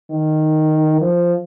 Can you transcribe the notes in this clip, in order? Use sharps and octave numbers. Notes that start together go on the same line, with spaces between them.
D#3
F3